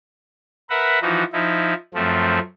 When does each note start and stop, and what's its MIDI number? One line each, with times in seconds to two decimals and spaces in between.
0.70 0.99 70
0.70 0.99 71
0.70 0.99 76
0.70 0.99 78
1.02 1.24 52
1.02 1.24 53
1.02 1.24 63
1.02 1.24 66
1.33 1.74 53
1.33 1.74 63
1.33 1.74 64
1.94 2.39 42
1.94 2.39 53
1.94 2.39 57
1.94 2.39 60